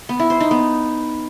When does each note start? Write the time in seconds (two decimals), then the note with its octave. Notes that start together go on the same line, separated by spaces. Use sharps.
0.09 B3
0.20 E4
0.30 C5
0.40 D#4
0.51 B3